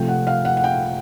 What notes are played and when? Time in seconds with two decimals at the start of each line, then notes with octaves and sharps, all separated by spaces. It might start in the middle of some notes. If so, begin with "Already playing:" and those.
Already playing: C3 F3 A3 G5
0.08 F#5
0.27 F5
0.45 F#5
0.57 F#5
0.64 G5